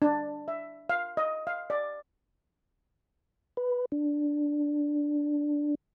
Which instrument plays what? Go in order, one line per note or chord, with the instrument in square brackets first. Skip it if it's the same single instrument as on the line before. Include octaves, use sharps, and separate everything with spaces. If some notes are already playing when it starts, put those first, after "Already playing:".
[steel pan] D4
E5
F5
D#5
F5
D5
[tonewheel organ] B4
D4